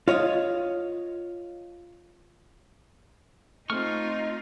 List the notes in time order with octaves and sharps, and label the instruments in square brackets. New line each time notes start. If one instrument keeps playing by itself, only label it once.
[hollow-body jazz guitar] F4 C#5 D#5 F5
[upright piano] A3 C4 [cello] D#4 F4 [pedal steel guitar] C#6 F6